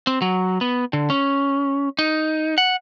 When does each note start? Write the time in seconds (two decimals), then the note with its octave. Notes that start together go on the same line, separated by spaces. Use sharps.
0.07 C4
0.22 F#3
0.61 B3
0.93 D3
1.10 C#4
1.99 D#4
2.58 F#5